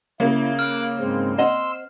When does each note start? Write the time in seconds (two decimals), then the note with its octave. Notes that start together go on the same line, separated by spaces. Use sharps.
0.20 C#3 A#3 E4
0.59 D6 F6 F#6
1.00 G#2 G#3 C4
1.38 C4 D#5 F#5 C6 E6